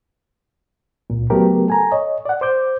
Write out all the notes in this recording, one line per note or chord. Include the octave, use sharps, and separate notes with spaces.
C#2 A#2
C#3 F#3 A3 B3 G4 A#4
A4 G#5 A#5
C#5 D#5
D5 F#5
C5 D6 G6